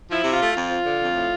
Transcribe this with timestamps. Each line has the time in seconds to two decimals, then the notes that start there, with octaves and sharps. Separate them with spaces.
0.08 F3 E4
0.23 C3
0.33 F4
0.39 A3
0.53 F2 F4
0.69 F3
0.84 D3
0.99 F2
1.14 A2